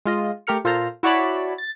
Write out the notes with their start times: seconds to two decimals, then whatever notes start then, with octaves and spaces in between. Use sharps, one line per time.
0.05 G#3 F4 D#5
0.47 A3 G4 A#4 F6 C#7
0.64 A#2 F4 A4 C5 A#5
1.03 E4 F#4 C#5 D5 A5 B5
1.58 A6